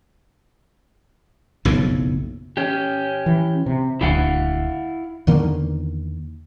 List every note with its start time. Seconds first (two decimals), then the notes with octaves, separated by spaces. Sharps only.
1.65 F#1 B1 F2 A2
2.57 C#4 G4
3.26 E3
3.66 C3
4.01 D#1 D2 E4 F5 F#5
5.27 E2 D3 D#3 A#3